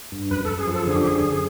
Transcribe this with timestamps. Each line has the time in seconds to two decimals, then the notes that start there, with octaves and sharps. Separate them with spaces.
0.12 G2
0.30 F#2 B4
0.45 F#2 A4
0.58 G#4
0.68 F3
0.73 A4
0.84 D3 G#4
0.96 G4
1.05 F#2 G#4
1.24 F#2